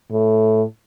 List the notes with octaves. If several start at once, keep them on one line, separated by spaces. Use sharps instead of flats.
A2